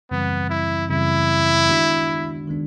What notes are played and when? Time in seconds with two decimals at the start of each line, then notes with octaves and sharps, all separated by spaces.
0.11 F#2 C#3 E3 G3 B3 C4
0.50 E4
0.90 F#2 C#3 E3 G3 C4 E4
1.69 D#3 G#3 B3 D4 F#4
2.48 D#3 G#3 B3 D4